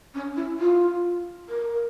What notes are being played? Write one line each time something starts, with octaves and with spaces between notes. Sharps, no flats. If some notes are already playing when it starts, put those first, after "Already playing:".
C#4
E4
F4
A#4